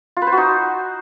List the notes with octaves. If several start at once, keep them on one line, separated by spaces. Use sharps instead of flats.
F4
B4
C5
F#4
D#4